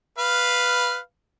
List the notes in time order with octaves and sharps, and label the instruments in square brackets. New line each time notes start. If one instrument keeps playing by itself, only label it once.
[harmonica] B4 F5